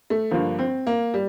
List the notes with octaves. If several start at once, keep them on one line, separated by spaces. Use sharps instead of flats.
A3
G2 D3 F3 A#3
C4
A#3
G3